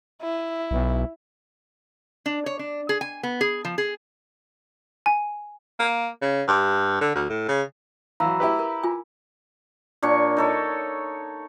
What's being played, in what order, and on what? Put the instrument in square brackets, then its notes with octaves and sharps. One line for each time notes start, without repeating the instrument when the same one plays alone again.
[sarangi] E4
[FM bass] B1
[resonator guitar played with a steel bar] D4
C#5
D4
G#4
G#5
B3
G#4
F3
G#4
[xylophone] G#5
[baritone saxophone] A#3
C#3
G2
D3
D2
A2
C#3
[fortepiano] E3 F#3 [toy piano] F5 [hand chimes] A#5 B5 E6
[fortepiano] E4 G4 B4
[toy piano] A#4
F4 G#5
[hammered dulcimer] A#2 D4 C#5 C#6
D#4 A4 C#5